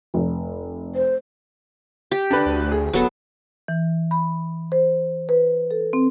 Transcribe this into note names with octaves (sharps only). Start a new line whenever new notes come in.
F1
C5
G4
D3 D4 B4
D2
G#4
D1 F#3 B3 A4
E3
B5
C5
B4
A4
C4